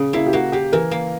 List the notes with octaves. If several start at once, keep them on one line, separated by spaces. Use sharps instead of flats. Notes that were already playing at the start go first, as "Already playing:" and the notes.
Already playing: A#2 C#3 C#4
A#3 E4
G4
A#3 F#4
A#3 G4
E3 A#4
A#3